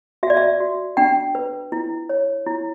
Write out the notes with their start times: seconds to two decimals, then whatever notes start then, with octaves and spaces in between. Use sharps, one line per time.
0.23 F#4 E5
0.30 D5
0.37 E5
0.60 F#4
0.97 D4 G5
1.35 B4
1.72 E4
2.09 C#5
2.47 E4